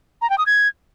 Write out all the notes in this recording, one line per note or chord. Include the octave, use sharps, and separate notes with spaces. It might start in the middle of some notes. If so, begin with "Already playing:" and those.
A#5
G5
D#6
G#6